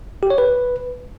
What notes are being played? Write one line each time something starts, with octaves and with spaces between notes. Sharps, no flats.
G4
C#5
B4